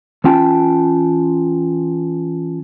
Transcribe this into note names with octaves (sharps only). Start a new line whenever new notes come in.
E3 C#4 F4 G5 A5